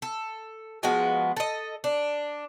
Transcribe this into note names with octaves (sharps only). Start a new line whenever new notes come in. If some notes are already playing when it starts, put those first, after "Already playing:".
A4
F3 G#3 B3 F#4
A4 D#5
D4